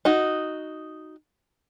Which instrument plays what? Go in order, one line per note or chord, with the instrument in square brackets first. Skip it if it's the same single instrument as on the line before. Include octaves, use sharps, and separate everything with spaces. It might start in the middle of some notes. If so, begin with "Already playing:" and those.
[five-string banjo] D#4 F#4